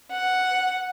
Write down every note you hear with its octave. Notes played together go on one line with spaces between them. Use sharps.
F#5